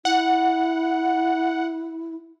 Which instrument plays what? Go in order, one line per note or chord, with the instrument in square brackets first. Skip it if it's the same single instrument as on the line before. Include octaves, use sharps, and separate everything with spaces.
[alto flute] E4 [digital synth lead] F#5